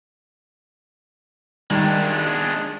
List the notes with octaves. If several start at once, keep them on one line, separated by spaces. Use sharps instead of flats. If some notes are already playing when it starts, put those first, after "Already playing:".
D#3 G3 G#3 D4